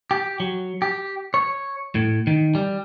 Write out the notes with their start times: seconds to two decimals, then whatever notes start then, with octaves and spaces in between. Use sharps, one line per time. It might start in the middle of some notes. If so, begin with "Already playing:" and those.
0.11 G4
0.40 F#3
0.82 G4
1.34 C#5
1.95 A2
2.27 D#3
2.55 G3